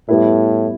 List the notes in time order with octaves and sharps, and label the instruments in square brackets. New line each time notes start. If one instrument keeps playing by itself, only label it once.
[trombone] A2 [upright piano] G3 B3 E4